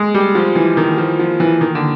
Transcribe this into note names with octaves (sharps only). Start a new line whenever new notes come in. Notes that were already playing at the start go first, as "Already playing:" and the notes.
Already playing: G#3
G3
F3
E3
D#3
F3
F3
E3
D#3
D3